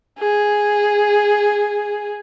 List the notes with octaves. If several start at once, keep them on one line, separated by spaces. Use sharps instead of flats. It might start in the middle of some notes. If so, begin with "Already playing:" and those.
G#4